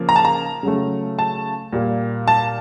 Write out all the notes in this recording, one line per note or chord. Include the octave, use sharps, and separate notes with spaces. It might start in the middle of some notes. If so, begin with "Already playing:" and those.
Already playing: C#3 F3 A#3
A#5
A5
A#5
C#3 F#3 A3
A5
A#2 G3 A#3
A5